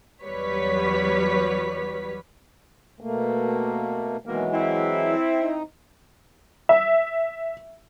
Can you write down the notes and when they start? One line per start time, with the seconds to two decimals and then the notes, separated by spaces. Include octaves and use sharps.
0.23 E2 F#3 G3 B4 C#5 B6
3.01 B2 A3 A#3
4.26 B2 D#3 E3 F#3 G#3 A#3
4.52 C4 E4
5.41 D#4
6.69 E5